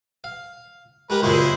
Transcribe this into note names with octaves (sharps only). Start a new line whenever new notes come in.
F5
G#3 G4 A#4 B4
C#2 F#2 A#2 G#3 E4 C5